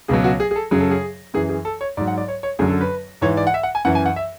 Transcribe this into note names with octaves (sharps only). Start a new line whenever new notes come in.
C#2 B2 F#3 G#4
F#4
G#4
G#4
A4
F#2 C#3 F#3 G#4
A4
G#4
F#2 E3 G#4
G#4
A4
C#5
G#2 F#3 D5
F#5
D5
C#5
C#5
F#2 D3 F#3 G#4
A4
B4
G#2 E3 C#5
D5
F#5
E5
F#5
G#5
F#2 E3 F#5
G#5
F#5
E5